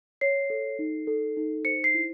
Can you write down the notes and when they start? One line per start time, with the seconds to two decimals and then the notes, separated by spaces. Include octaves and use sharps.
0.21 C#5 C7
0.50 A4
0.79 D#4
1.07 A4
1.37 D#4
1.65 C5 C#7
1.84 C7
1.94 E4